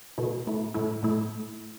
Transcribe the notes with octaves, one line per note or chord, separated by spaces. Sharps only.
B2 A3 E4
A2 A3 E4
A2 A3 E4
A2 A3 E4